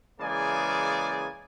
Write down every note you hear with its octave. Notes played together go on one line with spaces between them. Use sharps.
C#3 E3 G#3 A#3 D5 G#5